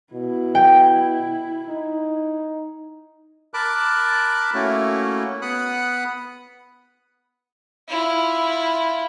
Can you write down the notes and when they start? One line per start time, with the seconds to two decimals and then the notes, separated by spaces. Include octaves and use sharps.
0.14 B2 E4
0.55 G5
1.68 D#4
3.54 A#4 A5 B5 D6 F#6
4.54 A3 A#3 C#4 E4 F#4
5.42 B3 F#5 B5 D#6 F#6
7.89 E4 F4